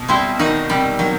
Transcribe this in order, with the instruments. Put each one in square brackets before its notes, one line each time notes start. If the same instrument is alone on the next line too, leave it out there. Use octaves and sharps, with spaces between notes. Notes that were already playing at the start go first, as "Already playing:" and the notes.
Already playing: [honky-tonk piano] B2
[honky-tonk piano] G3 [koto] C4 E4
[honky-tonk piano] D#3 [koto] D#4 F#4
[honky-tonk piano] C3 [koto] G3
[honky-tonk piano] D#3 [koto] F#3